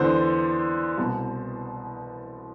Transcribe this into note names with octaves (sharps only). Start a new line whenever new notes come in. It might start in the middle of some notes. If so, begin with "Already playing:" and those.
Already playing: E2 D3 C5
C2 B2